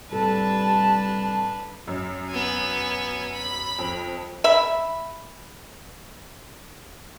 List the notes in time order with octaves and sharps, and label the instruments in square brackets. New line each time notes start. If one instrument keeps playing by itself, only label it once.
[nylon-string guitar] A2 C3 A4 [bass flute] G3 [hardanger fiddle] D4 B4 [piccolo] A5
[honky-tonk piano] F#2
[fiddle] B3 G#5
B5
[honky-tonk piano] F2
[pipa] E5 B5